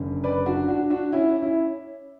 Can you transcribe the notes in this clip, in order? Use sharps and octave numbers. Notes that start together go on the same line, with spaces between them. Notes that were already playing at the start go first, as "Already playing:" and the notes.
Already playing: F#1 F#2 D3
B4 D5
D4 F#4
D4 F#4
D4 F#4
C#4 E4
C#4 E4